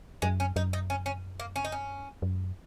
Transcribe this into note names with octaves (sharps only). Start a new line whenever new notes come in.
F#2 G#3
C#4
F#2 D#4
D#4
C#4
C#4
A#3
C#4
D#4
C#4
F#2